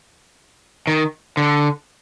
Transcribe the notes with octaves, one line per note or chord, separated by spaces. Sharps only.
D#3
D3